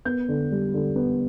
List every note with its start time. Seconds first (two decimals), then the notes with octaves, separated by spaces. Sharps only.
0.05 B3 G6
0.29 D3
0.51 G3
0.74 D3
0.96 B3